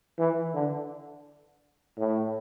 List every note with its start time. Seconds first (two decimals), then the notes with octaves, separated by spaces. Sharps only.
0.18 E3
0.53 D3
1.97 A2